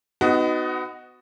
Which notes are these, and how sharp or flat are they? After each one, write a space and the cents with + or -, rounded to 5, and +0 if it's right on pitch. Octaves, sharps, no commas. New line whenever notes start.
B3 +30 D#4 +0 F#4 +0